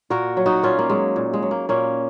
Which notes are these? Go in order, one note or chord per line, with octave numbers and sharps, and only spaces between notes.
A#2 F#4 A#4
F#3
D#4 F#4
A#2 C#4 F4
A#3
F#3 G#3
A#2
G#3
F#3
A#3
A#2 A#3 C#4